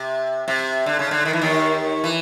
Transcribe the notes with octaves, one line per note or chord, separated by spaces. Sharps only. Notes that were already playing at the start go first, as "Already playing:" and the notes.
Already playing: C3
C3
D3
C#3
D3
D#3
E3
D#2 D#3
E3